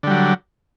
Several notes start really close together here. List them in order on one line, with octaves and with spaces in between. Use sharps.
D3 G3 F#3